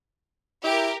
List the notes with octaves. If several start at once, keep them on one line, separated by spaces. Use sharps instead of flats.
E4 G4 A#4